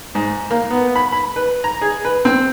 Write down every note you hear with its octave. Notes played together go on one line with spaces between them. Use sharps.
G#2
A#3
B3
B5
B5
B4
A#5
G#4
B4
C4